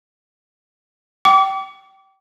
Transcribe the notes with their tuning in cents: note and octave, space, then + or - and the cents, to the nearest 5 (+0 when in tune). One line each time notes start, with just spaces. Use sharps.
G5 -25 D6 -30